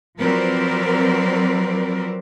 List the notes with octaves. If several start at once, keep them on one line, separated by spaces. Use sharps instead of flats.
F3 F#3 C4 A#4 B4 D5